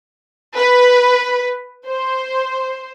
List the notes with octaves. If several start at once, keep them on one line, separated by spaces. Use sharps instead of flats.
B4
C5